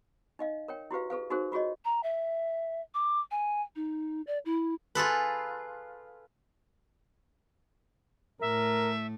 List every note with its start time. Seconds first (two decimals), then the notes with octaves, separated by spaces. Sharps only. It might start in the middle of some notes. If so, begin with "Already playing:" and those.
0.39 D#4 D#5 F5
0.68 A#4 C#5 G5
0.91 E4 F#4 G4 B4 F5
1.10 G#4 A4 B4 F5
1.30 D#4 F#4 G#4 A#4 C5
1.52 F4 F#4 G#4 C#5 D#5
1.85 A#5
2.03 E5
2.94 D6
3.31 G#5
3.76 D#4
4.27 D5
4.45 E4
4.95 F4 G#4 A4 B4
8.41 A2 A3 A#4 E5